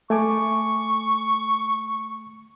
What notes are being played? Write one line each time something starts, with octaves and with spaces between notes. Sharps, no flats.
A3 G#5 C#6 D6